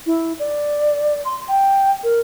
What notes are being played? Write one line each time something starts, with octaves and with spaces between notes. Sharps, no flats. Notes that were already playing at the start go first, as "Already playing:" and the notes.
E4
D5
C6
G5
A#4